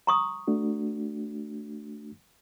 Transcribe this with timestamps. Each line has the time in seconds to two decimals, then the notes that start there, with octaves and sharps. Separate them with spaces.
0.07 A#5 C#6 D#6
0.48 A3 D4 F#4